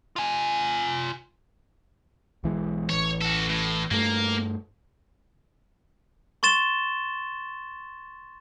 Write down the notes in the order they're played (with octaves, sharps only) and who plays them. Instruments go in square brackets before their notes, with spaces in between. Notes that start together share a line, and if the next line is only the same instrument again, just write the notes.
[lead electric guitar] F4 G#5
[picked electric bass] B1 E3 G#3
[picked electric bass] A1 E3 [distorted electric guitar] C#5
[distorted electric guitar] F#4 A4
A2
[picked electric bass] G2 A3 [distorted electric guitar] A#3
[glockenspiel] C6 C#6 A6 E7 G7